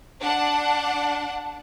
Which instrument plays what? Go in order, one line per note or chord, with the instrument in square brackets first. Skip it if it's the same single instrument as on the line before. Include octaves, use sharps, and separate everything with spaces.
[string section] D4 F#5